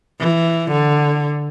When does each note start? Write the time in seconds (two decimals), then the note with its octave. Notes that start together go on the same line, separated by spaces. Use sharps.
0.20 E3
0.71 D3